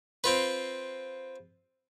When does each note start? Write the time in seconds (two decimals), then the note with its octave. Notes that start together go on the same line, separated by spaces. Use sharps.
0.24 C4 F4 B4